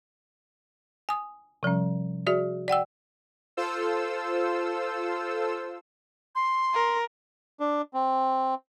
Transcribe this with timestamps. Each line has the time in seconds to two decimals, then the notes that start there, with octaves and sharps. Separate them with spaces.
1.09 G#5 D#6
1.63 C3 F3 G3 C#4
2.27 F#4 G#4 D5 E5
2.68 D5 F#5 G5 E6
3.57 F4 A4 C5 E6
6.35 C6
6.74 A#4
7.60 D4
7.94 C4